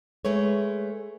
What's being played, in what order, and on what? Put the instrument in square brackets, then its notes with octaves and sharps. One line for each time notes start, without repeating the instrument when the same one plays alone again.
[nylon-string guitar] G#3 A3 B4 C#5